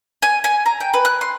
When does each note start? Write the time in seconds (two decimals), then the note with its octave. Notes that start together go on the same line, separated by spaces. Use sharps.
0.22 G#5
0.44 G#5
0.66 A#5
0.80 G5
0.94 B4
1.05 F#6
1.21 C6